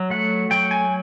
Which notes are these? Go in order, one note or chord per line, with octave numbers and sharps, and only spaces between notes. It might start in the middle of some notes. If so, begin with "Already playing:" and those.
Already playing: F#3
A3 F#5
F#3 G5
G#5